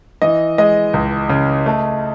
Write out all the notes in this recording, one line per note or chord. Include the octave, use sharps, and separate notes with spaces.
E3 D#5
G#3 D#5
C#2
C#3
A3